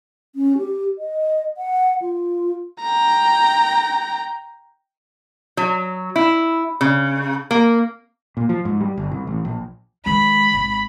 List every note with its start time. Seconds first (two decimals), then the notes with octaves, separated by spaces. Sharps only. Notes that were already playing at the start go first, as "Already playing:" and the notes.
0.36 C#4
0.58 G4
0.99 D#5
1.57 F#5
2.02 F4
2.83 G5 A#5
5.57 F#3
6.16 E4
6.81 C#3
7.51 A#3
8.37 A#2
8.49 F3
8.65 G#2
8.81 G3
8.98 G1
9.12 C2
9.27 A1
9.45 A#1
10.06 D#3 G#3 B5
10.54 G#1